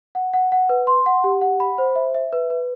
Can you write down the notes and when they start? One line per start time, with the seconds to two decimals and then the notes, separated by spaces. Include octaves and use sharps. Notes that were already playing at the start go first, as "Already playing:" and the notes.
0.15 F#5
0.34 F#5
0.52 F#5
0.69 B4
0.87 C6
1.06 F#5
1.24 G4
1.41 F#5
1.60 B5
1.78 C5
1.96 E5
2.14 E5
2.33 B4
2.50 B4